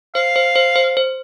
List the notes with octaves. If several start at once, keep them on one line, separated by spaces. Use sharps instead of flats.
C5 F5
C5
C5
C5
C5